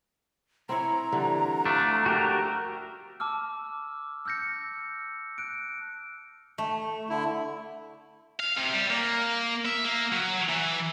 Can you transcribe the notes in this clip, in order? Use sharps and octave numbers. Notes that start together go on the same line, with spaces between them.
C4 E4 C#5 A#5
D3 E3 G3
F3 A3 D4
F#4 G4 A#4
A5 D6 E6 F6
E6 F6 G6 A#6 C#7
F#6 D7
A3
D3 E4
F5
C3
G3
A#3
E5
A#3
F#3
E3